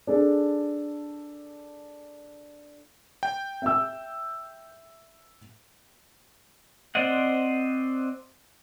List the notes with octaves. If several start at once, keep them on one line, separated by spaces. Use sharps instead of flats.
D4 G#4 A4
G5
E5 E6
C4 C5 D5 D#5 F#5